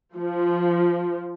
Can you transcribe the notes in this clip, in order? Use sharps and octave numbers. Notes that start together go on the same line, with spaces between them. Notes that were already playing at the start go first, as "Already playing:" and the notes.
F3